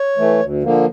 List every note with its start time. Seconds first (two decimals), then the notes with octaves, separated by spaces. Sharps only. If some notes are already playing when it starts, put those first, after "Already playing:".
Already playing: C#5
0.17 E3 A3
0.40 D2
0.62 D3 F3 A#3